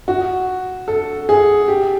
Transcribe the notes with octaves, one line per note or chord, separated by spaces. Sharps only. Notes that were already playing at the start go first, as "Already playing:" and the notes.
F#4
A4
G#4
G4